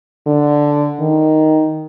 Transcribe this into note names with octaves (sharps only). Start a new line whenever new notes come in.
D3
D#3